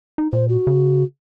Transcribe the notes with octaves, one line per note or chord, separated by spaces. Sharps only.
D#4
A#2 C5
F#4
C#3